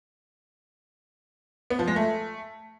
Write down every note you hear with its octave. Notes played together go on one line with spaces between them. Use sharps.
B3
F3
G#3
A3